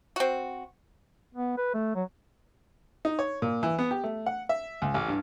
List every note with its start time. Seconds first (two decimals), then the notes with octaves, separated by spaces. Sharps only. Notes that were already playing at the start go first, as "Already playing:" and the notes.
0.16 C4 F#4
1.35 B3
1.58 B4
1.74 A3
1.95 F#3
3.05 D#4
3.19 C#5
3.42 A#2
3.63 E3
3.79 B3
3.91 G4
4.04 A3
4.26 F#5
4.49 E5
4.82 C#2
4.94 A1
5.08 G2